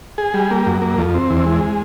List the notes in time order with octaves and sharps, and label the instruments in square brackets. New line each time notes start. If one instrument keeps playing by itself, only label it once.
[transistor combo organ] G#4
G3
A#3
F#2
A#3
F2
C4
E2
G#3